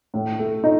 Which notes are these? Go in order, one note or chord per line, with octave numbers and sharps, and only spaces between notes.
A2
A3
D#4